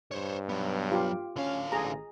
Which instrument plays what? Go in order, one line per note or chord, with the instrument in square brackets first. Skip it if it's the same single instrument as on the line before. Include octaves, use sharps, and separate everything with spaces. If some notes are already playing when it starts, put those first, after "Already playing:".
[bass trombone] G2 [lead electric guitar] C5 C#5
[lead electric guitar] F#3 B3
[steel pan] F4 G4
[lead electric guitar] D3 F5 [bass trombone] C#4
[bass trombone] A1 [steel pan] G#4 A#5